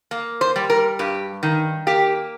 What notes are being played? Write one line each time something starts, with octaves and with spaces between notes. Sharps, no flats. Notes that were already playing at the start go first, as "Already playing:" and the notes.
A#3
C5
G3
A#4
G2 G4
D#3
A#3 G4